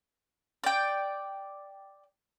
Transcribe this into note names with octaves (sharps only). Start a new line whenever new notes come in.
D5 G5